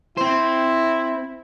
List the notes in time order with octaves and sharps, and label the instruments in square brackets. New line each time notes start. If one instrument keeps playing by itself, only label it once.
[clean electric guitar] C4 C5 [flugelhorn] E4